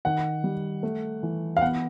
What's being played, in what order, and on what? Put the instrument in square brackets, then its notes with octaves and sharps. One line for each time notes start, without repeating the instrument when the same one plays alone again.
[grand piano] D#3 [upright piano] F#5
[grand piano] G3
A3
E3
[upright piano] F5
[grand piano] B3 [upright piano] F#5